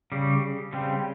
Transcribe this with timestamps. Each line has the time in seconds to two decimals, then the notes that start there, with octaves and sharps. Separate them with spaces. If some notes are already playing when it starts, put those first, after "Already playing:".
0.12 C#3 G3
0.73 C#3 G3 C4